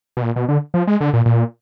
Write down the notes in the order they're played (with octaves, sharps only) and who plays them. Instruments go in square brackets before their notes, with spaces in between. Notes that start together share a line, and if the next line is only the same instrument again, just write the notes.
[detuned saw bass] B2
A#2
B2
D3
F3
G#3
D3
A#2
A#2